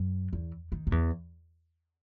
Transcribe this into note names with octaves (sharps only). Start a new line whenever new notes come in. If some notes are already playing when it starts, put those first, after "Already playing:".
Already playing: F#2
E2
D#3
F#2
E2